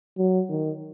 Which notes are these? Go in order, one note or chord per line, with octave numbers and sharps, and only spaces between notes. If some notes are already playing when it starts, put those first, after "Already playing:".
F#3
D#3